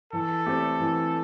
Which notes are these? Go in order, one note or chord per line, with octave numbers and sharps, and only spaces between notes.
E3 A4
A3 C4 G4
E3